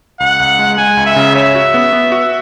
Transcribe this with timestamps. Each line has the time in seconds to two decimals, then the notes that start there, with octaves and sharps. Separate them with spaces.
0.20 C#2 F#5
0.40 C#2
0.59 G#3
0.78 G#3 G#5
0.97 C#2
1.06 E5
1.16 C#3
1.35 C#5 E5
1.55 F#4
1.74 B3
1.93 B3
2.12 F#4